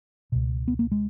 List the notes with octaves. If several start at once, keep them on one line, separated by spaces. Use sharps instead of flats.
C#2 B2
B3
A#3
G#3